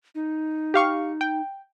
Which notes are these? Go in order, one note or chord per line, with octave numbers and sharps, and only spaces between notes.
D#4
G4 F5 C#6
G5